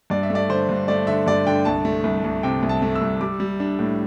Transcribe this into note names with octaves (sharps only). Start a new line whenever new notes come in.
G2 D5
E5
A3
D5
D3 C5
G2
A3 D5
D3 E5
G2 D5
D3 G5
C2 A5
A3
C2
C2
C3 G5
C2
A5
A3
E6
C2
G3 D6
G3
D4
A2